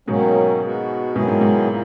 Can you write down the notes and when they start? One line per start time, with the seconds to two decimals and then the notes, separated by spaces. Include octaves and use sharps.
0.08 G#2 B2 D#3 F#3 A#3 C#4
0.62 G#3 B3 F#4
1.15 G#2 B2 D#3 F#3 B3 E4 G#4
1.28 G#2
1.41 G#2
1.68 A#2 A#3